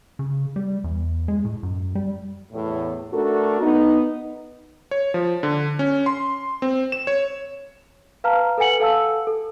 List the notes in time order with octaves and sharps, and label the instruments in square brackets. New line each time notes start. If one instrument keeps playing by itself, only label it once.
[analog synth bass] C#3
G3
E2
G#3
A2
F#2
G3
[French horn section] E2 A2
A3 D4 F#4 A4 A#4
B3 D#4
[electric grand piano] C#5
F3
D3
C#4
C6
C4
E7
C#5
[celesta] B4 F5 A5 A#5 F6
A4 B4 F#5 G#5 C#7 F#7
A4 F5 A5 E6
A4